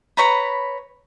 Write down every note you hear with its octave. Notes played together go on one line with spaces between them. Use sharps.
B4 C#5 A#5 B5